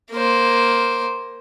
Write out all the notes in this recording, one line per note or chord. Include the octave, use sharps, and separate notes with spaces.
A#3 C5